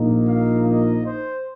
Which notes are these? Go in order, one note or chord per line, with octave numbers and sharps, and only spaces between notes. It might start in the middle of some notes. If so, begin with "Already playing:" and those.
Already playing: A#1 A#2 A#3 D#4
F5
D#5
C5